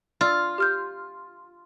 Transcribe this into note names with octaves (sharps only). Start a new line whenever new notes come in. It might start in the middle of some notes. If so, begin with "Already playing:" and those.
F4 D5 E6 A6
G4 F6 G6